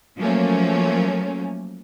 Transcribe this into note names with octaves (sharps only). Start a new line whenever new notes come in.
F3 F#3 A3 A#3 C#4